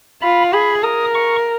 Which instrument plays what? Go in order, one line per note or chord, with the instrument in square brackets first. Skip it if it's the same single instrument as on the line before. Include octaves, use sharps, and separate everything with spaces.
[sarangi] F4 [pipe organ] B5
[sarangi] G#4 [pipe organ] B5
[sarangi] A#4 [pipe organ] D#6
[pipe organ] C#6